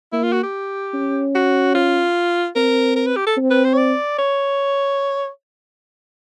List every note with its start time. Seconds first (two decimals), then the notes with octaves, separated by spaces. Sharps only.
0.12 A#3 E4
0.23 F4
0.32 F#4
0.43 G4
0.94 C#4
1.35 F#4
1.75 F4
2.56 C4 A#4
2.96 A#4
3.06 B4
3.16 G4
3.26 A4
3.37 C4
3.50 B4
3.64 C5
3.74 C#5
3.77 D5
4.18 C#5